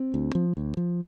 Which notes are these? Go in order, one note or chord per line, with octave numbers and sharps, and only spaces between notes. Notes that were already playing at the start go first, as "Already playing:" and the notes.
Already playing: C4
D2
F3
D2
F3